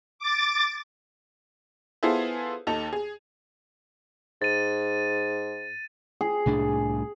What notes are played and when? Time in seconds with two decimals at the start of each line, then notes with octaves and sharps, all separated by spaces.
0.19 D6 A6
2.03 B3 E4 F4 G#4 A4 C5
2.67 D#2 D#4 A4 A5 F7
2.93 G#4
4.42 G#2 A6 D#7
6.21 G#4
6.46 C2 A2 D4